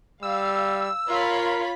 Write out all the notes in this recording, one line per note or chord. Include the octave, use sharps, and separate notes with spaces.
G3 F5 E6
F4 A#4 C#5 B5